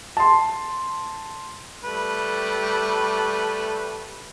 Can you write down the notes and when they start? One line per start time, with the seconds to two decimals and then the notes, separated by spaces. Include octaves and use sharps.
0.17 A5 C6
1.84 G3 A3 B4